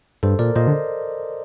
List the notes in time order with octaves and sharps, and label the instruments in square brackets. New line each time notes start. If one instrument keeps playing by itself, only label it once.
[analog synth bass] G2 [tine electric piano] A4 C5
[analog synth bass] A#2 [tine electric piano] A#4 D5
[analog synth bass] A#2 [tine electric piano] C5 D#5
[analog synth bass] D3